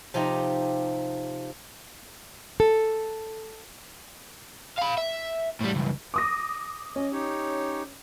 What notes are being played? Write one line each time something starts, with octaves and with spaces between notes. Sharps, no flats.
C3 F3 D#4 G4 A#5
A4
F5 B5
E5
A2 G3
C#2 G2
D6 D#6 A#6
C#4 D#5
D#4 G4 C#5